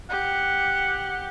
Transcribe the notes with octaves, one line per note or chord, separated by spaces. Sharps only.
G4 F#5